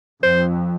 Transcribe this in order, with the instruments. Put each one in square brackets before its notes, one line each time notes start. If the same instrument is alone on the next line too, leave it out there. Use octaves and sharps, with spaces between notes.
[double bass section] F2 [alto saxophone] C5